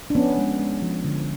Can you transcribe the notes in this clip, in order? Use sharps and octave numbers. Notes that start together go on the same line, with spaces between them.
D4
F3 B3 C#4
G#3
G#3
F3
D3